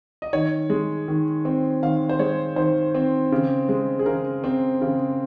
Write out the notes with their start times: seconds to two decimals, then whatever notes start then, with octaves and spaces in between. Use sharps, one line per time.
0.22 D#5
0.33 D#3 C#5
0.70 G#3
1.08 D#3
1.45 C4
1.83 D#3 F5
2.09 C5
2.19 G#3 C#5
2.56 D#3 C5
2.95 C4
3.32 C#3
3.69 G#3
3.99 G#4
4.06 C#3 A#4
4.44 C4
4.82 C#3